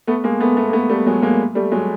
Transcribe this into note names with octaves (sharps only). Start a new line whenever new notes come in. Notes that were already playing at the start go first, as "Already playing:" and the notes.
A3 B3
G#3 A#3
A3 B3
A3 B3
A#3
A3 B3
G3 A3
F#3 G#3
G#3 A#3
G3 A3
F#3 G#3